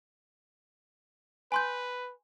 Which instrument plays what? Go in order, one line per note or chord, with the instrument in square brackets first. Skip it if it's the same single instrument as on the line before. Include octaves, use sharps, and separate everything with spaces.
[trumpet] B4 [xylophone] G#5 C6 G6